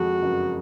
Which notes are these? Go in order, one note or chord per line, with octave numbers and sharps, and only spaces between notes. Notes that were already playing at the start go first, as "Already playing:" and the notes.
Already playing: F2 G#3 F#4
F#1